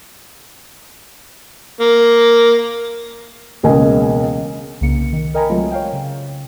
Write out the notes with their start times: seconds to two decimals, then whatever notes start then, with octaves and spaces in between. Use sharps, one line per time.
1.81 A#3
3.63 E1 C#2 A#3 D#5 G#5
4.81 C2 C#3 A#3 C#7
5.13 D#3
5.34 A#4 D#5 G5 G#5 A#5 B5
5.50 F#3 G#3 A3 C4 F4
5.71 C#5 F5 G5
5.93 C#3